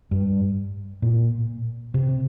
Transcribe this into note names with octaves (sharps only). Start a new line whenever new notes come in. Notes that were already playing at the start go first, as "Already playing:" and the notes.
G2
A#2
C3